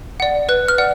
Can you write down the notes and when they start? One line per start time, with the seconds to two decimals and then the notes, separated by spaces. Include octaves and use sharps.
0.20 D5 F#5
0.49 B4 F#6
0.68 F6
0.78 D5 F#5